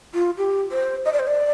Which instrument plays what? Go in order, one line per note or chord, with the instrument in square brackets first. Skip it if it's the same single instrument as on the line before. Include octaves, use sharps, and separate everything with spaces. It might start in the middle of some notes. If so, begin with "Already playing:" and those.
[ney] F4
G4
C5
D#5
D5
C5
D5